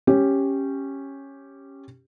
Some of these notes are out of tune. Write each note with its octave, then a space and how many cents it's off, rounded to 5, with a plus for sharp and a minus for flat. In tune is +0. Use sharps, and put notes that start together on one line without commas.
C#4 -10 G4 +0